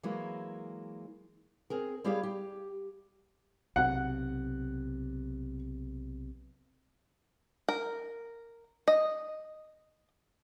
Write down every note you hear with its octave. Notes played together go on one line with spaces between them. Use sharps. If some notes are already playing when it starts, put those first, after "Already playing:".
E3 F#3 G#3 A#3 E4
C4 G#4 A#4
G3 E4 G4 G#4 C#5 F5
G4
B1 C3 F#5
A#4
D#5